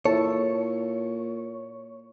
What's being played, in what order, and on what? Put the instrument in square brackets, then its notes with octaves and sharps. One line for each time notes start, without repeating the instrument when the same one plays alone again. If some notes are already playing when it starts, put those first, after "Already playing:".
[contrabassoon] A#2 [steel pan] E4 A4 A5 [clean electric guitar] C#5